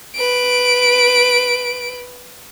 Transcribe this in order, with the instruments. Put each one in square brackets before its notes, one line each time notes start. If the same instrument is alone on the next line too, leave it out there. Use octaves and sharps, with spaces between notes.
[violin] B4 D7